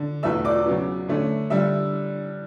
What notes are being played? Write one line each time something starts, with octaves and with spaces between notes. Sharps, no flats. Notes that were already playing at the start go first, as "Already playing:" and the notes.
Already playing: D3
E2 B2 A3 E5 E6
D5 D6
C#3 F#3 B3
D3 A3 C#4
D3 G3 D4 E5 E6